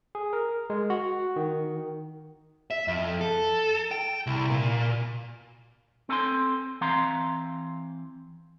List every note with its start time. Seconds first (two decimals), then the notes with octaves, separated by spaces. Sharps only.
0.15 G#4
0.33 A#4
0.70 G#3
0.90 F#4
1.36 D#3
2.71 E5
2.88 F2
3.21 A4
3.91 G5
4.27 C2
4.50 A#2
6.09 C4 A4 G#5 A5 C6
6.81 E3 C4 F5 A#5 C6